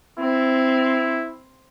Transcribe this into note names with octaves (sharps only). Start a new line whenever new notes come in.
C4 E4